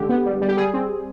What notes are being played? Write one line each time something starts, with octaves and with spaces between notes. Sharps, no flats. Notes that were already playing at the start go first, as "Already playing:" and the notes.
Already playing: D3 G#3 G4
B3
G3
G3
G4
G3 G#4
C4